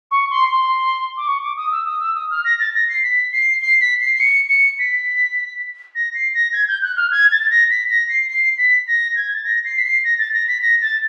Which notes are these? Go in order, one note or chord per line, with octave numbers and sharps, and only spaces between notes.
C#6
C6
C6
D6
C#6
D6
D#6
E6
D#6
E6
D#6
F6
A#6
A6
A#6
C7
B6
C7
C7
B6
C7
C7
C#7
C#7
B6
A#6
C7
A#6
G#6
G6
F#6
F6
G#6
A6
A#6
B6
A#6
C7
C7
B6
A#6
G#6
A6
A#6
C7
B6
C7
A#6
A6
A#6
B6
A#6
A6